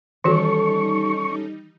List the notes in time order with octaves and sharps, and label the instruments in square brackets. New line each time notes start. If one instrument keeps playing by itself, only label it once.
[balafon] D#3 E3 F#4 [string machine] G3 D#4 [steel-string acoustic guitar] C#4 A4 [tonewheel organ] C#6